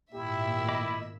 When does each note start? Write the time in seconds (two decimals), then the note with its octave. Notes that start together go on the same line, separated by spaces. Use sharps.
0.14 G#1 A#2 E4 G4 E5
0.68 D#5 B5 D6